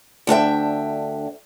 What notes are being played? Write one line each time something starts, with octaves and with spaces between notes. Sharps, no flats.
D2 D4 E5 G5